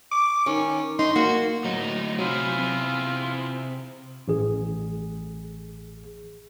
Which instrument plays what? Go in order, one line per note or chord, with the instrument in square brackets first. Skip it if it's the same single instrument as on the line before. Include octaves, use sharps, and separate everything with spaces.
[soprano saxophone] D6
[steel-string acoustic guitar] D#3 [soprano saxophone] C#4
[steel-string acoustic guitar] D#4 [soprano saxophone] C6
[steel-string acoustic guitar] A#3 [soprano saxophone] F#4
[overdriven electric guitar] D2 A2 [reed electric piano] F#3 [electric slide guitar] D#4
[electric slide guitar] C3 [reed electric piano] F#3 [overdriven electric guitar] E4 G#4 [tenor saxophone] F4
[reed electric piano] C4
[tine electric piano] A1 G#4